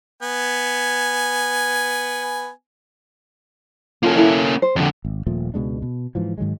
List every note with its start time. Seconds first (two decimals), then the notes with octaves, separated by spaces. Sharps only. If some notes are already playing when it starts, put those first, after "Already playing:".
0.22 B3 G#5
4.03 A#3 C#4 F4 A4
4.15 E4 A4 E5
4.62 C5
4.76 F2 D3 G4 A4
5.05 G#1
5.27 D#1 A#2 F3 A3
5.54 C#2 B2 G#3 D4
5.82 B2
6.15 G#2 E3 F3
6.38 G#2 D#3 F#3 G#3